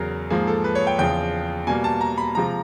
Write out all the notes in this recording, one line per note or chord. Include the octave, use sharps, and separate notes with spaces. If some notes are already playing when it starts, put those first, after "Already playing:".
Already playing: E2 C#3 F#3 A#4
G#2 F3 A#3 G#4
A4
B4
C#5
G5
E2 C#3 F3 G5
B2 G3 A#3 G#5
A5
A#5
B5
C3 F3 G#3 A#5